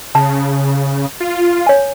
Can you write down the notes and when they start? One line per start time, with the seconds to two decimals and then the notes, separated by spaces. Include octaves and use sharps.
0.15 C#3 A5
1.20 F4
1.66 C#5 G#5